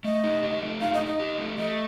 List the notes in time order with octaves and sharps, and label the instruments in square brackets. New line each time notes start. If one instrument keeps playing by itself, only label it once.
[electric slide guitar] A3 [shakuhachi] D#5
[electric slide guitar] D#4
G4
A3
[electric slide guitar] D#4 [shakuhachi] F5
[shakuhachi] D#5
[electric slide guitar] D#4
[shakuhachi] D#5
[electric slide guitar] G4
A3
[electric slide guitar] A3 [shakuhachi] D#5